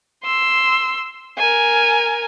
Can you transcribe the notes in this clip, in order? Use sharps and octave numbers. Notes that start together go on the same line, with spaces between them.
C6 E6
A#4 G#5